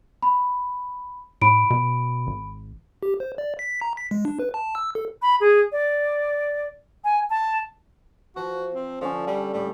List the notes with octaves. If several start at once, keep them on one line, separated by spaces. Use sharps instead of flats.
B5
A2 B5 D7
B2
G#1
G4
C5
D5
B6
A#5
B6
G#3
D4
B4
A5
E6
A4
B5
G#4
D5
G#5
A5
F3 F#4
C4
D3 F3 C#4
G3
A2 G3